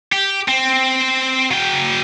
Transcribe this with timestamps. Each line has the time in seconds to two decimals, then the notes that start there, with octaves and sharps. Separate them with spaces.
0.12 G4
0.48 C4
1.51 F#3 G5